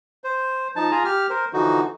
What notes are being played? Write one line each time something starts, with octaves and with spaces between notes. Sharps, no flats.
C5
F3 D#4 A5
F4 G#4 G#5 A#5
G4 F6
A#4 C5
D3 E3 F3 D#4 F#4